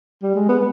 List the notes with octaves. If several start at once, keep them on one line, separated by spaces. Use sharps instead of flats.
G3
G#3
B3